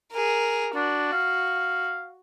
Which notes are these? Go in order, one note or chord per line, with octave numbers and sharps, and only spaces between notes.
G#4 A#4
D4 F#4
F5